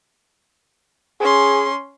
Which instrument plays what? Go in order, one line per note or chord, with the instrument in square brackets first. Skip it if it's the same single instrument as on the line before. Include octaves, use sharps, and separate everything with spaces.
[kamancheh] C#4 C6 [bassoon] G#4